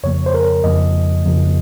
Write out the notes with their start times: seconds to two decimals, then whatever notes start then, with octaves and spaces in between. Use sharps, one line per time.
0.03 F2 C#3 F3 A#3 C#5
0.26 C5
0.34 A#4
0.64 F2 C#3 F3 A#3 D#5
1.25 F2 C#3 F3 A#3